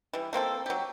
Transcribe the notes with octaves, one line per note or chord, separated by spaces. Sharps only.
E3 G3
A3 A#3 C4 A4
F#3 G4